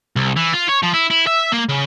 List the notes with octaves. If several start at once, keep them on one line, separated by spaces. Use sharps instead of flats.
C2
E3
F4
C#5
F3
E4
E4
E5
A#3
C#3